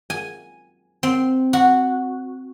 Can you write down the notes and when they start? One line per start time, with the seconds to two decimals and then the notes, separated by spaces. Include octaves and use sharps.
0.10 G#5
1.03 C4
1.53 F#4